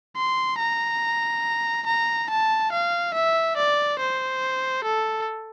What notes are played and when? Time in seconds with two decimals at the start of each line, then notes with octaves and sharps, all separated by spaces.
0.16 C6
0.59 A#5
1.86 A#5
2.30 A5
2.72 F5
3.14 E5
3.57 D5
3.99 C5
4.84 A4